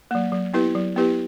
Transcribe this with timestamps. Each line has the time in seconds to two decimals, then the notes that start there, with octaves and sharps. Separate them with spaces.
0.11 F#3 A#3
0.32 F#3
0.54 B3 E4 G4 B4
0.75 F#3
0.96 B3 E4 G4 B4